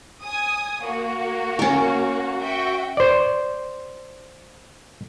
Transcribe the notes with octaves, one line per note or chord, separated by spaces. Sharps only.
G#5 D#6
A#3 F#4
C#4 A#4
F#4 E5 G5
C5 D5